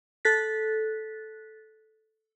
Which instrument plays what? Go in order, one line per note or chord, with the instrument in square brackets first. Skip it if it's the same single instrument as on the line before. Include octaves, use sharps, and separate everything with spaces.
[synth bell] A4 F#6 A6 B6